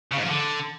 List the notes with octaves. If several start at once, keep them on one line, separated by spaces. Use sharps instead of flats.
C#3
G#2
F3
D3